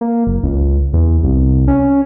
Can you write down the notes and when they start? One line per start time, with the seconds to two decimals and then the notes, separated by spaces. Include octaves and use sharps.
0.01 A#3
0.27 F#1
0.43 C#2
0.93 E2
1.23 C2
1.68 C#4